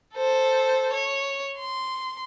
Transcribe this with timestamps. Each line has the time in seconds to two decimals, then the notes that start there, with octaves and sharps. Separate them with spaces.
0.15 A4 C5
0.93 C#5
1.59 C6